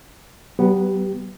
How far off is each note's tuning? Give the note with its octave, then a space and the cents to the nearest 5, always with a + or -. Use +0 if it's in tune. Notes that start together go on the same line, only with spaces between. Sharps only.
F#3 +45 B3 +0 G4 -10